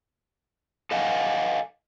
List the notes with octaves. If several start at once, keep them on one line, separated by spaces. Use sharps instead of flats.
A4 D#5 F5 F#5 G#5